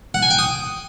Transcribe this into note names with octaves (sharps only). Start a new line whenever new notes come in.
F#5
G#5
G5
D#6